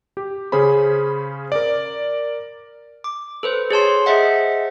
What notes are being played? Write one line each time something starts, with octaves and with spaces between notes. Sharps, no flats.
G4
C#3 C#4 G#4 C5 B5
A#4 D5
D6
A4 B4 C5
G#4 C#5 A5 C6
G#4 C5 D#5 E5 F#5